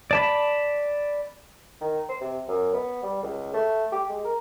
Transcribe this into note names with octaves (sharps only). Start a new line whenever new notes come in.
D5 A5 B5
D#3
C5
C3
F#2
B3
G3
C#2
A3
G4
G#3
A#4